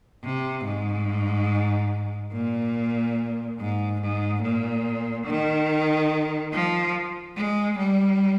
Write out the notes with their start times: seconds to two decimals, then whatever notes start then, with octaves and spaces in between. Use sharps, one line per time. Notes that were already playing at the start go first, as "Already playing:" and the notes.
0.24 C3
0.65 G#2
2.33 A#2
3.59 G#2
4.01 G#2
4.43 A#2
5.27 D#3
6.53 F3
7.36 G#3
7.78 G3